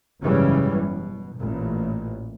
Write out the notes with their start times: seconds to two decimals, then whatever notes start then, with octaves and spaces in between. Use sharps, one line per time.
0.23 F#1 G#2 C#3 E3 G3 C#4
0.72 B2
1.37 A1 A#2